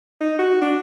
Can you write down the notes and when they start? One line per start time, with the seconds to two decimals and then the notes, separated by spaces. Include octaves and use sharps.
0.21 D#4
0.39 F#4
0.62 D4